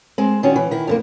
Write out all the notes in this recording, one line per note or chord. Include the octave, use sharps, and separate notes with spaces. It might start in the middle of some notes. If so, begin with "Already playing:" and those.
G#3 C4
D#3 C#4 D4 F#4
E3
D#3 E4
F2 D3 A#3